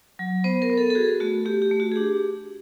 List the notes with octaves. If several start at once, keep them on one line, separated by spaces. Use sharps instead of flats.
F#3
B3 C5
A#4
B3
A4
A4
F#4 G#4
A3 F#4
A3 G4
G4
A3
F#4
G#4
D4 G4